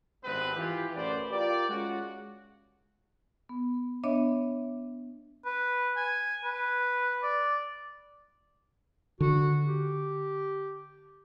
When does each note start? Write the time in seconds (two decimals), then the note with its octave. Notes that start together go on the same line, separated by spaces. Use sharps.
0.24 G#1 G2 G#3 B3 C4 B4
0.55 E3 F4 G4
0.95 A1 F#2 B4 C5 D5
1.32 F4 G4 A#4 D5
1.69 G#3 C#4 F4 F#4
3.49 B3
4.04 B3 D4 C#5 D#5 E5
5.45 B4
5.96 G#5
6.44 B4
7.23 D5
9.20 D3 F#4
9.67 G4